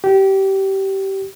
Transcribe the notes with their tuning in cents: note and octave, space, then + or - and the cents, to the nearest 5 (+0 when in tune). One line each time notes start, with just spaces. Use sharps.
G4 -20